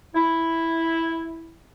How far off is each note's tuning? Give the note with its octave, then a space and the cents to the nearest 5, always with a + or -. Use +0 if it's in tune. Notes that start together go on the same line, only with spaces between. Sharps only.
E4 -5